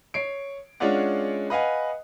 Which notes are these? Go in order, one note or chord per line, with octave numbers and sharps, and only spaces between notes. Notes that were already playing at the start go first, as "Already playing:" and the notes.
C#5 C7 D7
G#3 C#4 D4 F4 D5 F#5
B4 D#5 F5 F#5 G#5